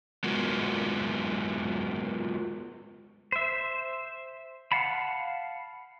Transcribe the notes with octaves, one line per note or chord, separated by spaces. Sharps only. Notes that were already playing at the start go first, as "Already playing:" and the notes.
G#3 B3 F4 F#4 A#4
C5 E5
F5 F#5 A5 B5